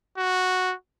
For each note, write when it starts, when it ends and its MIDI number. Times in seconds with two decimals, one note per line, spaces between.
0.18 0.74 66